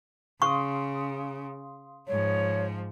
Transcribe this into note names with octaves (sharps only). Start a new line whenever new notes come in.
C#3 F5 C6 C#6 D#6
G#2 F3 C#5